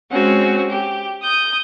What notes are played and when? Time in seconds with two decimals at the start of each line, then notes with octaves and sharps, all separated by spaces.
0.11 G#3 C4 C#4 F#4
0.70 G4
1.22 D#6 G6